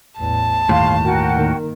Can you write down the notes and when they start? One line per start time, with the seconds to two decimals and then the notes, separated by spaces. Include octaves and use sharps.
0.18 A1 E2 A5
0.69 G1 D#2 A2 F5 C6
1.04 F#4 A#4 G5
1.33 D#3 A#3